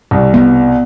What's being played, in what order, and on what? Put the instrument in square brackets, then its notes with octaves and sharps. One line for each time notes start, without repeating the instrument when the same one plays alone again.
[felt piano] C2
[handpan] B3